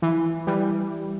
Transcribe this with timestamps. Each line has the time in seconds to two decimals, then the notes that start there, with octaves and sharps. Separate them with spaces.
0.02 E3
0.47 E3 G3